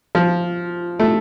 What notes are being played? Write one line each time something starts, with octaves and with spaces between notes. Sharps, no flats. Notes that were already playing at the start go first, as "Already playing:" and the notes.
F3
A3